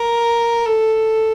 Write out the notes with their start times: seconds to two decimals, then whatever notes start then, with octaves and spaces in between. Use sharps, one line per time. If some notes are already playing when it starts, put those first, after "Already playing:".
Already playing: A#4
0.65 A4